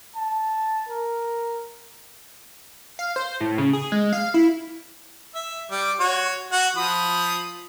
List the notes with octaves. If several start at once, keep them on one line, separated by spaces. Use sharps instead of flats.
A5
A#4
F5
C5
A2
C#3
G#4
G#3
F5
E4
E5
G3 D6
F#4 C#5
F#4 F#5
F3 B5 D#6